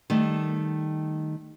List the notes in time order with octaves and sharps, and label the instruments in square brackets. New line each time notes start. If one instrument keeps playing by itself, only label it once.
[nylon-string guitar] D#3 G3 A3